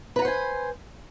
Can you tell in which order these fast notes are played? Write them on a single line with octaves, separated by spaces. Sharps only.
B4 A#5 F#5 C5 G#5